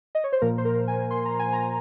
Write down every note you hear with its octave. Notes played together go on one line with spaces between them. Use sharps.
D#5
C#5
C5
A#2 F3 A#3 A#4
C5
A#4
G#5
C6
A#5
G#5
A#5